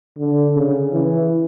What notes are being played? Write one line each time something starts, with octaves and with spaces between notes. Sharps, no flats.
D3
C#3
E3